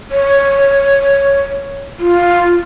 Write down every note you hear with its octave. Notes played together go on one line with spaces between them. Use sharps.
C#5
F4